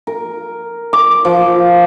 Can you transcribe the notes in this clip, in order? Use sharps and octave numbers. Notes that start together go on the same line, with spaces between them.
A#4
D6
F3